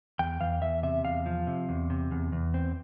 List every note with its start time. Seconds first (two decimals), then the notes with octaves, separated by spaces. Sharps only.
0.19 E2 G5
0.41 E2 F5
0.62 E2 E5
0.83 C3 E5
1.04 E2 F5
1.26 F3
1.47 C3
1.69 E2
1.90 C3
2.11 E2
2.32 E2
2.54 C4